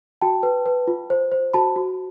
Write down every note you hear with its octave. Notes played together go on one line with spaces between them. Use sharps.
F#4 G5 A5
B4
B4
F4
C5
C5
F#4 A5 B5
F#4